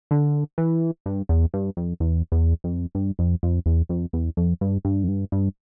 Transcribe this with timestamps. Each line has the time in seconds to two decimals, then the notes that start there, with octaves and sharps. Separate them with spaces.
0.11 D3
0.58 E3
1.06 G2
1.29 E2
1.54 G2
1.77 F2
2.00 E2
2.32 E2
2.64 F2
2.95 G2
3.19 F2
3.43 F2
3.66 E2
3.89 F2
4.13 E2
4.37 F2
4.61 G2
4.85 G2
5.03 F2
5.08 G2
5.32 G2